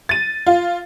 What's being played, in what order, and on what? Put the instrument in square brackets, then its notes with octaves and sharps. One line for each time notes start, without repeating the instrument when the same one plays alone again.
[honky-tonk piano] A6 D#7
F4